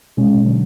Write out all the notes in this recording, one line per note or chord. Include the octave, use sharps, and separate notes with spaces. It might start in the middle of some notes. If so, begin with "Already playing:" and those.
B2 G#3 C#4
D3 F#3